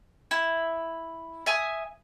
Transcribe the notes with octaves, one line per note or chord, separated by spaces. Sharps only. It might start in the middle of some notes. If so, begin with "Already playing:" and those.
E4
E5 G#5 D#6